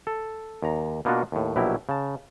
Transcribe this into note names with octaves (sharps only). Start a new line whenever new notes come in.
A4
D#2 A#5
B2 A#3 B3 D4 F4 F#4
D#2 A2
A#1 B2 F#3 E4 G4
C#3 A5